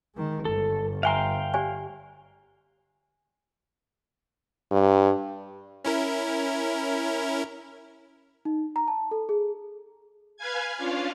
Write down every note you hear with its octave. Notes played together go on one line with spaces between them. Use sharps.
D#3 G#3
G1 A4
E5 F5 G5 G#5 A#5 C6
G4 D5 G#5
G2
C#4 E4 A#4
D#4
A#5
A5
A4
G#4
B4 F5 G#5 G#6
C#4 D4 F4 F5